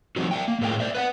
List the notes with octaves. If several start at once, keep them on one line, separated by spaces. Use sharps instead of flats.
F3 G3 C4 D#4 F#4
D5 E5 G5
A#3
A2 G#3 A#3 E4 G5
C5 D5 E5
B4 F5 F#5